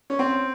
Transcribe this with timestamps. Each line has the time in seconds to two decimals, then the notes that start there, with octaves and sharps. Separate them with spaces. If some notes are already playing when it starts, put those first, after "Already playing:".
0.10 C#4
0.19 C4